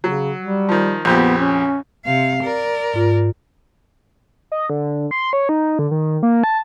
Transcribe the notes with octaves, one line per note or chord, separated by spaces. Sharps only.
C#3 F#3
G3
D#3 F3
A#1 F2 B3 G4
C#4
C3 F5
A#4 D5
G#2 F4
D#5
D3
C6
C#5
D#4
D3
D#3
A#3
A5